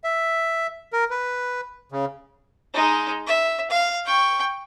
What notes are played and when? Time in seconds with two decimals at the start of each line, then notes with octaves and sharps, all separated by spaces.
0.04 E5
0.93 A#4
1.11 B4
1.92 C#3
2.74 G#3 D#4
3.27 E5
3.71 F5
4.05 G5 C#6